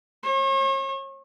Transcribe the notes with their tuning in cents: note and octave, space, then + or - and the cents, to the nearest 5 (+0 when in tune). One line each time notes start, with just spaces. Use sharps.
C#5 -40